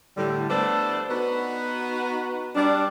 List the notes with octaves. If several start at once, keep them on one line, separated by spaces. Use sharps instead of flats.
A2 D3 G3
A3 B3 D4 A4 C5 D5
B3 D#4 F#4 B4
G3 D4